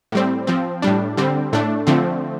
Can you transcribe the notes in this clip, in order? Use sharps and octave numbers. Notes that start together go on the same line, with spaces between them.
A2 G3 C4
F3 C4
A2 G3 D4
D3 G3 C4
A2 A3 D4
D3 F3 A3 C4